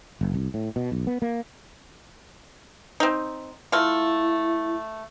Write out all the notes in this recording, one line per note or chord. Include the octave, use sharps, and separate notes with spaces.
F#1
C2
A2
B2
B1
B3
A#3
C4 D#4
A3 E4 F4